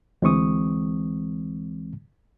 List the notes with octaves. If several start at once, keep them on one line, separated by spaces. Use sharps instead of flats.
D2 E3 G#3 C4 C#6 D#6